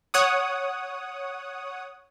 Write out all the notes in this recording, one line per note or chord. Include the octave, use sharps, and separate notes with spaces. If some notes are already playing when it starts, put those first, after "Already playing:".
C#5 F#5 D#6